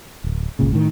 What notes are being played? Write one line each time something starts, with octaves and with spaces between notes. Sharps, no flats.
D1
G1 C#2 A#2 C#3
A2 D#3